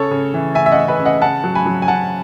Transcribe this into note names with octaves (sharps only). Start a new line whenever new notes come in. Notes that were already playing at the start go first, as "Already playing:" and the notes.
Already playing: C#3 A4 C#5
C#3
E3
C#3 E5 G#5
E5
D#5 F#5
C#3
B4 D#5
C#3
D#5 F#5
C#3 F#5 A5
F#3
G#5 B5
F#3
G#5
F#3 F#5 A5